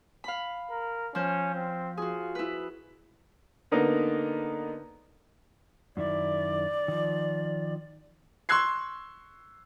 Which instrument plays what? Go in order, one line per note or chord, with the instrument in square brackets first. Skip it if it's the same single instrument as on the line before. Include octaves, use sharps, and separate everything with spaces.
[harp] F5 B5
[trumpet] A#4
[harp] F3 C5 [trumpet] C#4
[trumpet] C4
[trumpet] F4 [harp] F#4 G#4
[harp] E4 B4
[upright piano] D3 A#3 B3 D#4
[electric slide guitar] F#2 D#3 E4 [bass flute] D5
[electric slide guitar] D#3 F3
[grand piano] C6 C#6 E6 F#6 G#6 C7